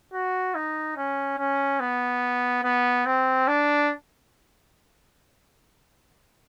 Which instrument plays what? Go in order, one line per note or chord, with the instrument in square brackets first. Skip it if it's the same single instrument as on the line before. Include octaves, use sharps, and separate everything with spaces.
[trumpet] F#4
D#4
C#4
C#4
B3
B3
C4
D4